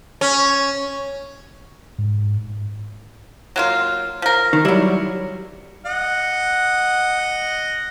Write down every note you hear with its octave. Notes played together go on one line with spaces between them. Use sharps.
C#4
G#2
F#3 A#3 F4
F3 A#4
D#3
F#3 G3 E4
D#5 F#5